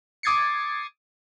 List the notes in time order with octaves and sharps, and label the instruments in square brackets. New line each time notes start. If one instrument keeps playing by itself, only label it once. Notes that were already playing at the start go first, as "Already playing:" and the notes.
[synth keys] D6 D#6 G#6 A6 C7 C#7